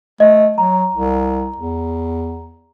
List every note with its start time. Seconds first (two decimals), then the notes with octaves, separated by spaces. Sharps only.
0.20 A3 D#5
0.58 F#3 A#5
0.94 C2
1.56 E2